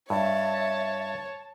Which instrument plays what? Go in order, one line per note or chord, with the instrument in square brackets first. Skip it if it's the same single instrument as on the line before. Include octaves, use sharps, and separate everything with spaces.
[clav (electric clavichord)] G2 [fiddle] C#5 [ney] E5 [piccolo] A5